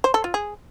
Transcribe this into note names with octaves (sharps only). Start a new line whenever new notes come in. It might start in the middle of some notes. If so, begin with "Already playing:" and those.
C5
A4
F4
G#4